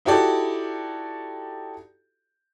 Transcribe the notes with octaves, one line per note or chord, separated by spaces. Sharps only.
D#4 E4 F#4 G4 A4 D5